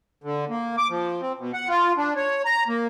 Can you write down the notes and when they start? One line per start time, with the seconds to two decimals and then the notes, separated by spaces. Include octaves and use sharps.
0.24 D3
0.49 A#3
0.78 D6
0.90 F3
1.21 C4
1.39 B2
1.53 F#5
1.68 F4
1.97 D4
2.16 C#5
2.45 A#5
2.68 A#3